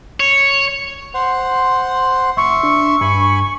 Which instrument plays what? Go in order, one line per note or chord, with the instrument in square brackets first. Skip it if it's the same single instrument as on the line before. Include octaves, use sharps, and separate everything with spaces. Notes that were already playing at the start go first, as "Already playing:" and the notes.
[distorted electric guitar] C#5
[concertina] C5 F#5 C6
[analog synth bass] F#1 [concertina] E5 C6 [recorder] C#6
[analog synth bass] D4
[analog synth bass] G2 [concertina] G#5 B5